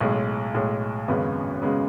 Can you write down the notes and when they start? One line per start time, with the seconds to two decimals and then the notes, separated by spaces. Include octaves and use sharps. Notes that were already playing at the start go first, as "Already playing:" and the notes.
0.01 B1 A2 G#3
0.54 B1 A2 G#3
1.08 G#1 F#2 C#3 G#3 B3
1.62 C#3 G#3 B3